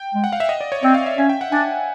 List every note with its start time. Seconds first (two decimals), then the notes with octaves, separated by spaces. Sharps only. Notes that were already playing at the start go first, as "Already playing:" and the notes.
Already playing: G5
0.14 G#3
0.24 F#5
0.32 F5
0.40 E5
0.49 D#5
0.61 D5
0.72 C#5
0.83 C4 D5
0.94 F5
1.06 E5
1.18 C#4 E5
1.29 G5
1.41 F#5
1.52 D4 G#5